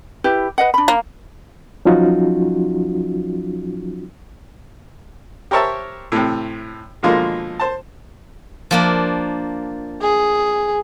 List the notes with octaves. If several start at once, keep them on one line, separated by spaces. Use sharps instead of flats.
E4 G4 B4
B4 D#5 F#5
D4 B5
A#3
F3 F#3 C#4 D#4 F4 F#4
G4 A#4 C5 C#5 E5 A5
A2 C3
B2 D3 F3 G#3 A#3 F4
C5 A5
F3 A#3 D4
G#4